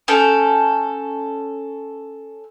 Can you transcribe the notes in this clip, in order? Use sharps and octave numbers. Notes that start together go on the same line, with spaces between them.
C#4 A4 G5